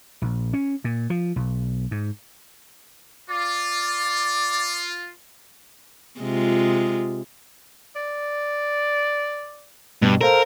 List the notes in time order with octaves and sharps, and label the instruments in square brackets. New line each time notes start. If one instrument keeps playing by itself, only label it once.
[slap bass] A#1
C#4
A#2
F3
B1
G#2
[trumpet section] F4 [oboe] D5
[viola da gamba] C3 G#3 F4
[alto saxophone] D5
[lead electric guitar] G2 [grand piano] B2
[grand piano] A4 C5 F5 [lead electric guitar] A#4